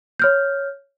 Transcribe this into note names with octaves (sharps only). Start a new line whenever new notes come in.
C#5 F6 G6